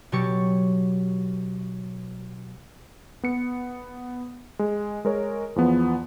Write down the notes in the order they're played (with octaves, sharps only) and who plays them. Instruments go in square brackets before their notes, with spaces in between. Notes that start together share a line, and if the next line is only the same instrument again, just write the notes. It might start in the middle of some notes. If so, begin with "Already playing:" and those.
[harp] B2 F#3 G4 C#6 A6 C#7
[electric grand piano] B3 C#7
G#3
G#3 A#4 C#5
E2 F3 B3